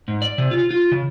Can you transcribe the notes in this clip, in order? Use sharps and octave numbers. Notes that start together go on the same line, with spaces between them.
G#2
D5
C3
F4
F4
C#3